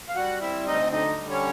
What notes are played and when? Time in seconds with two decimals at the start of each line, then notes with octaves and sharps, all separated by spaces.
0.09 F5
0.16 G3 F#4 F#5
0.42 C4 E4 E5
0.67 D2 D#4 D#5
0.92 D3 D#4 D#5
1.18 G3
1.30 C#4 C#5